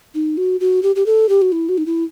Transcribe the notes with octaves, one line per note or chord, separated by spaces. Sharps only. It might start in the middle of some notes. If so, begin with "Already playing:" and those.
D#4
F#4
F#4
G4
G4
A4
G4
F#4
E4
F#4
D#4
E4